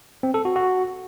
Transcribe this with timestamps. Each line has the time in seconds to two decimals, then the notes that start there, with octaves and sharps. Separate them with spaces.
0.23 C4
0.34 A4
0.45 F#4
0.56 F#4